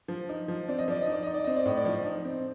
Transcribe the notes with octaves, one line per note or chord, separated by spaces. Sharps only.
F3
D#4
F3
C4 D5
D#5
F3 D5
D#5
D#4
D5
D#4 D#5
D5
C4 D#5
D5
A2 D#5
D5
F3
D#4
C4